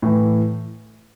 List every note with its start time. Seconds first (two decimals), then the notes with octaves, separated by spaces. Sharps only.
0.02 A2 E3